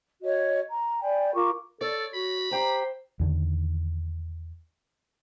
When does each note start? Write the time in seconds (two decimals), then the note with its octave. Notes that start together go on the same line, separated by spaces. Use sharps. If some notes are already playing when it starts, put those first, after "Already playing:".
0.22 F#4 C#5 D#5
0.69 A#5
1.01 D5 G5 G#5 B5
1.34 F4 A#4 C#6 D6
1.81 A4 C#5 D5
2.14 F#4 B5
2.51 G4 C5 G5 A#5
3.20 E2 D3 D#3